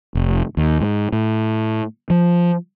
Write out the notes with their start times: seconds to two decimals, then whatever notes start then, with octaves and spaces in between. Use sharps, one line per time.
0.15 F1
0.57 D#2
0.81 G#2
1.12 A2
2.10 F3